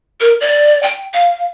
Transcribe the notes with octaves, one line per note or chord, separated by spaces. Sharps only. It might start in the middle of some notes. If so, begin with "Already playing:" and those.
A#4
D5
G5
F5